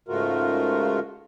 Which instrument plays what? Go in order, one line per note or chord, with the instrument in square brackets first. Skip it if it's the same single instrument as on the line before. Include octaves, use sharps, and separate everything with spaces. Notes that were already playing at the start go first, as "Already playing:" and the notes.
[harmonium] G#2 C#3 A3 F4 F#4 A#4